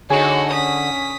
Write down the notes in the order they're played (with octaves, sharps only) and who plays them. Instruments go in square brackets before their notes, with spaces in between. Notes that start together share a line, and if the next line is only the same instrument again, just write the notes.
[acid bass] D3 [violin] D#4 F#4 [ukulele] G#4 [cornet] C#5
[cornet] C#4 [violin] D#6 B6